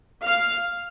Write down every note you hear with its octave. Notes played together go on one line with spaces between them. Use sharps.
F5